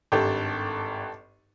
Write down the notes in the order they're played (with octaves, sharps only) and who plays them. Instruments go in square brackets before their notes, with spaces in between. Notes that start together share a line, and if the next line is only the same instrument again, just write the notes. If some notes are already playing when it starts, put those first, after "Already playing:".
[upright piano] G#1 G2 [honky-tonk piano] G4 A4